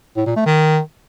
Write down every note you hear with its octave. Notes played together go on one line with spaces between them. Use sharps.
A2
A#2
A3
D#3